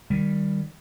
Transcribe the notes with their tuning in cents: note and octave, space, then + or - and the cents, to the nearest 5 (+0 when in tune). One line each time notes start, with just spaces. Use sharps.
D#3 +0 G3 +5